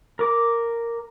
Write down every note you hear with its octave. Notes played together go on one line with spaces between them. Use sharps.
A#4 D6